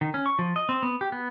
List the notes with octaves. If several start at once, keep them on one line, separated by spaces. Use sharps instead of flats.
D#3
C#4
C#6
F3
D#5
C4
B3
G4
B3